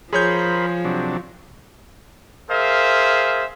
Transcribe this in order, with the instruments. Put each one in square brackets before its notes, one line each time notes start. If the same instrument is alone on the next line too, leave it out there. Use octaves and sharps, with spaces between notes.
[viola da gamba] F3 [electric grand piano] G#4 C#5 G6 [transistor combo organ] A#4 C5 B5
[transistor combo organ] C3 F#3 D4
[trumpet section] G#4 A#4 C5 E5 F5